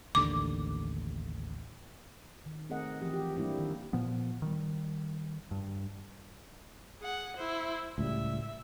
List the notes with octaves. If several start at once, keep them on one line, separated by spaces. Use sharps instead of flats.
A1 D#2 D3 D6
D#3
A3 C4 G#4 A#4 D#5 F#5
E3 F3 C4 G4
G4
G3 A#3 D4 E4 G4
D#3
A#2 F3 B3
D#3 G3
G2
G#4 F#5
E4 C5
C#2 A2 G3 E5